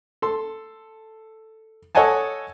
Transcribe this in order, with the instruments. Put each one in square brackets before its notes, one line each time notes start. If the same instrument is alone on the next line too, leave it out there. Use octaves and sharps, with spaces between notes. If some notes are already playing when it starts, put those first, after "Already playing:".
[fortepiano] A4 C6
A4 C#5 D#5 F#5 G#5 A5